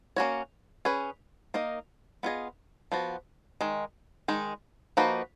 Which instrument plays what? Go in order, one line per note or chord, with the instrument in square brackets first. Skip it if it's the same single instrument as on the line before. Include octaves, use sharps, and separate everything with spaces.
[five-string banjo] A#3 C#4 F#4 C#5
C#4 G#4 B4
A#3 D#4 A#4 D#5
B3 F4 G#4 D#5
F3 B3 F#4
D#3 G#3
D#3 G#3 D#4
F3 A#3 D#4 F#4 B4